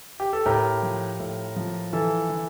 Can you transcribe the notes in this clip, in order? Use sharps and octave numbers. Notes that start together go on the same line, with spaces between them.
G4
A4
A2 G4 A#4
F3
A2
F3
E3 A4
E3